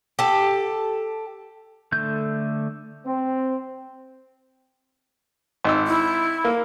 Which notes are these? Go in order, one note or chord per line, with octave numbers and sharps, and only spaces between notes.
G4 A4
D3 A3 G6
C4
G#1 E6
E4
A#3